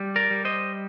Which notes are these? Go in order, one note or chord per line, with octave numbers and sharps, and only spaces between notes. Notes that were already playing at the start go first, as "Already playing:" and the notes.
Already playing: G3
A#4 D5
G3
C5 D#5